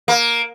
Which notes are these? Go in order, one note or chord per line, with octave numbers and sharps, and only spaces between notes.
A#3